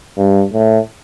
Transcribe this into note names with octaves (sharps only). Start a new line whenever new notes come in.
G2
A2